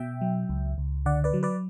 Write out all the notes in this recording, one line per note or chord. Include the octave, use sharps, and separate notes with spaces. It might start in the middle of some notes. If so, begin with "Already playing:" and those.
Already playing: B2 E5 G5
F#3
C#2
C#2
D3 D5 F#5
B4 D5
F#3
B4 D5